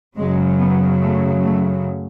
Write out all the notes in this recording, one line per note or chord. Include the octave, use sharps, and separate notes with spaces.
F#2 C#3 F#3 G#3
B3
A3
A3